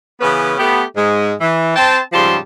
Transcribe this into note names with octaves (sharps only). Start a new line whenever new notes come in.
C#3 E3 B3 C#4 B4
A3 B3 G4
G#2 G#3
E3
C4 C5 G5 A5
G#2 C#3 F3 G3 A5 C6